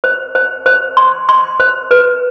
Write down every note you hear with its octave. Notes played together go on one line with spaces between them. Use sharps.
C5
C5
C5
C6
C6
C5
B4